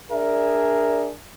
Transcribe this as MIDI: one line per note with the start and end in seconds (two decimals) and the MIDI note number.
0.11 1.11 62
0.11 1.11 68
0.11 1.11 70
0.11 1.11 74
0.11 1.11 76